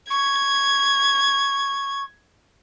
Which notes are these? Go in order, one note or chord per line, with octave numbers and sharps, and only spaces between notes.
C#6 G#6